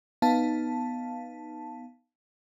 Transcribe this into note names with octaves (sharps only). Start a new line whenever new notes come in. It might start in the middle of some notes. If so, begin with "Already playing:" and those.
B3 D#4 F5 A5